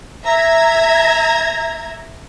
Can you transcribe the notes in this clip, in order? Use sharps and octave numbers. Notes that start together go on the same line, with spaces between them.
E5 A#5 G#6